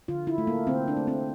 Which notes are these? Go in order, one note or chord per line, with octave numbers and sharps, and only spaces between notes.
D3 F4
E4
A3
A#3
D3 C4
D4
A3
C4